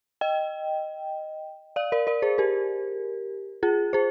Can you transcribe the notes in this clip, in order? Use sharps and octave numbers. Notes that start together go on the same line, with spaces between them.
D#5 G5
D5 F5
A#4 D5
A#4 D5
G#4 C5
G4 A#4
F4 G#4
G#4 C5